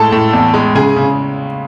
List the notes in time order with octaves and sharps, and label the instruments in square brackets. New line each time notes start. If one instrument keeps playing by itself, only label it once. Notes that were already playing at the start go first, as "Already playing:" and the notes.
Already playing: [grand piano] A2 G#3 [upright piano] A4 A5
[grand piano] A2
E2
G#3
[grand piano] C#3 [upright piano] G#4 G#5
[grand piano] C#3